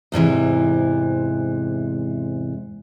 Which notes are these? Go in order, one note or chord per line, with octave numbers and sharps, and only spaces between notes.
E2 G#2 C3 E3